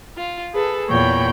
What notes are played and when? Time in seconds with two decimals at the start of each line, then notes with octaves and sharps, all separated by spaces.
0.17 F4
0.54 G#4 A4 B4
0.89 E2 A#2 C#5 G5 B5 G6